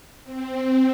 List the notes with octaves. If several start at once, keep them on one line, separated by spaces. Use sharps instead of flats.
C4